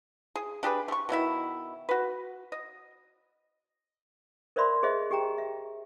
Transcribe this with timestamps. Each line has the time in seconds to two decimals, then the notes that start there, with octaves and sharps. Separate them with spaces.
0.36 G#4
0.63 D4 G4 G#4 B4
0.88 A3 C#6
1.09 B2 D#3 E4 E5
1.89 F#4 B4
2.52 D#5
4.56 A#4 C5 D5 E5 B5 C6
4.83 G#4 C5 D#5 E5
5.11 G4 G#4 G5 A#5
5.38 E5